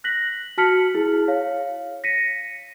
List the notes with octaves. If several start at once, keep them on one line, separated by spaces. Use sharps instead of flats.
F#6 A#6 B6 F#7
F#4 A5 F6 B6 C#7 F#7
E4 G#4
C#5 F5
A#6 B6 C#7 D#7